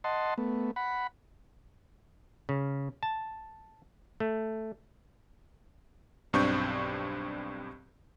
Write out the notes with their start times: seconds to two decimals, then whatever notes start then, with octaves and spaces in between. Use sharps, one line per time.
0.04 D#5 F#5 A5 C6
0.38 A3 B3
0.76 F#5 B5
2.49 C#3
3.03 A5
4.20 A3
6.33 B1 G2 C4 D4 C#6 G6